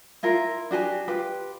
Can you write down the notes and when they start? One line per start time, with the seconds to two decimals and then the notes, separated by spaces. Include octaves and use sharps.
0.23 E4 F4 A#4
0.71 D4 F#4 G4 G#5
1.08 F4 G4 B4